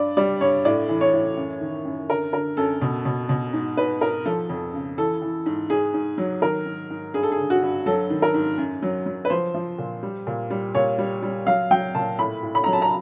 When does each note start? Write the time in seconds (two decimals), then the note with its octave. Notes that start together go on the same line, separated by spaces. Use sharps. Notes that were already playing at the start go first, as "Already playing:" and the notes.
Already playing: G2 D5
0.17 G3 D5
0.41 G2 C#5
0.65 A2 D5
0.89 E3
1.01 C#5
1.13 A2
1.37 F#2
1.61 D#3
1.85 F#2
2.09 D3 A#4
2.33 D3 A#4
2.57 F#2 A4
2.81 B2
3.05 B2
3.29 B2
3.53 G#2
3.77 G#2 B4
4.01 G#2 A#4
4.26 F3 A4
4.49 F2
4.74 C#3
4.98 E3 A4
5.22 E3
5.46 G#2
5.70 G#2 G#4
5.94 G#2
6.18 F#3
6.42 D#3 A#4
6.66 G#2
6.90 G#2
7.14 G2 G#4
7.23 A4
7.32 G#4
7.38 D3
7.50 F#4
7.62 G2
7.86 F#3 A4
8.10 D#3
8.22 A#4
8.34 G#2
8.58 F#2
8.82 F#3
9.06 F#3
9.25 B4
9.30 F3 C5
9.54 F3
9.78 A#2
10.03 G3
10.27 A#2
10.50 G3
10.75 A#2 C#5
10.98 G3
11.23 G3
11.47 F#3 F5
11.71 F#3 G5
11.95 A#2 A5
12.19 A2 B5
12.43 A2
12.55 B5
12.64 F#3 A#5
12.73 A5
12.82 A#5